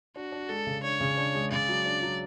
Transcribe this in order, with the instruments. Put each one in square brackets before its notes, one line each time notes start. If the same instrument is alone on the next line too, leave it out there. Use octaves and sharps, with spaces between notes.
[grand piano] D4 [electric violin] F#4
[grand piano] D4
[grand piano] G#3 [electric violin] A4
[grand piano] C#3
[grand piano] D4 [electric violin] C#5
[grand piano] C#3
D4
G#3
[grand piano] C#3 [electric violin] D5
[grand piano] F#3
D4
F#3